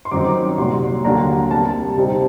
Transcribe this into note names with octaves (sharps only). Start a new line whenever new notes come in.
C6
F#2 D#3 F#3 C4 D#4 D6
C2 A#2 F#3 C6
D#2 D3 F#3 A#3 D4 A#5
C2 C3 G3 A#3 A5
C3 G3 C4 D#4